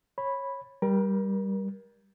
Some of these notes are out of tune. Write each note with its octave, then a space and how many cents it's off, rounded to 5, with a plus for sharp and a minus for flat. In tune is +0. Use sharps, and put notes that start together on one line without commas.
C#5 -20 B5 +0
G3 +0 A#4 +30